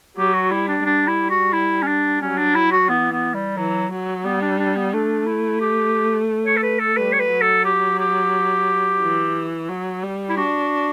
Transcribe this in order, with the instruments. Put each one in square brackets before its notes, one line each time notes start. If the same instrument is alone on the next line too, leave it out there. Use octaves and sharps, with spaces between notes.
[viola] F#3 [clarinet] G4
[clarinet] F#4
[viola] G3 [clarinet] E4
[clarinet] D4
[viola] G3 [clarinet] D4
[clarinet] E4
F#4
E4
C#4
D4
[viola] F#3 [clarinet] C#4
[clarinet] D4
E4
F#4
[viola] E3 [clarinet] B3
[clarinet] B3
G3
[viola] E3 [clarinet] F#3
[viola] F#3
[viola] G3 [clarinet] B3
[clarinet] D4
D4
B3
[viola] A3 [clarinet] D4
[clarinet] E4
G4
C#5
A4
B4
A4
[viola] G3 [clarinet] B4
[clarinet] C#5
B4
[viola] F#3
[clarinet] A4
G4
G4
[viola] E3
F#3
G3
[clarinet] E4
[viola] D4 [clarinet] F#4